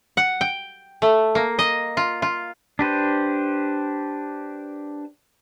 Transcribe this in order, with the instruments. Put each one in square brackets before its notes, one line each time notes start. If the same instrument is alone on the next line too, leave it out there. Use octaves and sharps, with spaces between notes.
[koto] F#5
G5
A3
A#3
D#5
F4
F4
[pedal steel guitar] D4 G4 B4 C5